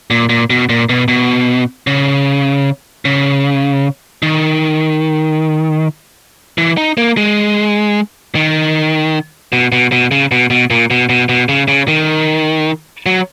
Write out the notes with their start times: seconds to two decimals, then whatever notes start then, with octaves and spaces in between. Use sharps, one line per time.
0.10 A#2
0.29 A#2
0.50 B2
0.69 A#2
0.89 B2
1.08 B2
1.87 C#3
3.05 C#3
4.23 D#3
6.58 E3
6.77 D#4
6.97 A#3
7.17 G#3
8.35 D#3
9.53 B2
9.72 B2
9.92 B2
10.11 C#3
10.31 B2
10.50 B2
10.70 A#2
10.90 B2
11.09 B2
11.29 B2
11.49 C#3
11.68 C#3
11.88 D#3
13.06 F#3